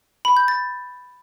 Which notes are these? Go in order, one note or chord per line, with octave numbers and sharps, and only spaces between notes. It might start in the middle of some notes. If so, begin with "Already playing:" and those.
B5
G6
A6